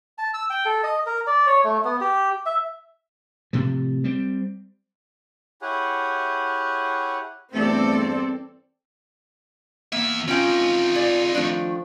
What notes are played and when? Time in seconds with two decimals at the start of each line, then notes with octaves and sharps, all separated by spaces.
0.18 A5
0.34 E6
0.50 G5
0.66 A4
0.83 D#5
1.06 A#4
1.27 D5
1.47 C#5
1.64 A3
1.85 B3
2.01 G4
2.46 E5
3.53 A2 C3 F3
4.04 G3 C4
5.62 E4 G4 G#4 C#5 F#5
7.54 E2 G2 A3 C4 A4 D5
9.92 E2 A#3 E5
10.28 C4 C#4 D#4 F4 G5
10.95 G#4 D5
11.35 D#3 F3 A3 D4